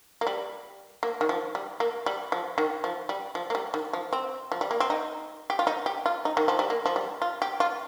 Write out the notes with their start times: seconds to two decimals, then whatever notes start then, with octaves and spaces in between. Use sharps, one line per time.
0.21 A#3
0.27 G3
1.03 A#3
1.21 D#3
1.29 F3
1.55 G3
1.80 A#3
2.06 G3
2.32 F3
2.58 D#3
2.84 F3
3.09 G3
3.35 F3
3.50 A#3
3.55 G3
3.74 D#3
3.93 F3
4.13 C4
4.52 F3
4.61 G3
4.71 A#3
4.80 C4
4.90 D#4
5.50 G4
5.59 F4
5.67 D#4
5.86 G4
6.06 F4
6.25 D#4
6.37 D#3
6.48 F3
6.59 G3
6.70 A#3
6.86 F3
6.96 G3
7.22 F4
7.42 G4
7.60 F4